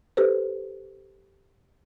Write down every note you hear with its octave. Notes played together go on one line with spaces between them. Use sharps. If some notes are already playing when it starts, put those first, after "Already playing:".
G4 A4 B4 C5